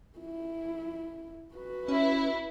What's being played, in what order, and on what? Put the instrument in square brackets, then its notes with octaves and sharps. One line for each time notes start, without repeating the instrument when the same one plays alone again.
[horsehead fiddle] E4
F#4 B4
[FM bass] C#4 [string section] E4